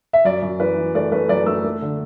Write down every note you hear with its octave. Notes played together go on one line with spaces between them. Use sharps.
E5
F#2 D5
F#2
E3 B4
E3
A3 D5
A3 B4
F#2 D5
A3 E6
A3
D3